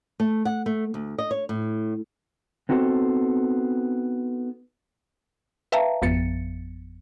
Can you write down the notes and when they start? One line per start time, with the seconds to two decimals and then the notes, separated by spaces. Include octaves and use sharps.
0.20 A3
0.45 F#5
0.66 A3
0.94 D2
1.18 D#5
1.31 C#5
1.49 A2
2.69 B3 C4 D#4 F#4 A4 C5
5.72 B4 E5 F5 G5 A5 A#5
6.02 G#1 F2 F3 B3 A6 C#7